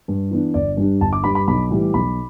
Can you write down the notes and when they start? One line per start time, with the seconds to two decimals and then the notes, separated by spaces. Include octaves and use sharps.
0.08 G2
0.31 E3 B3 D4
0.54 G1 D5
0.77 G2 G3 D4
1.01 G1 A5
1.13 D6
1.24 G2 G3 D4 B5
1.35 B5
1.47 B1 B5
1.70 A2 E3 G3
1.94 B1 B5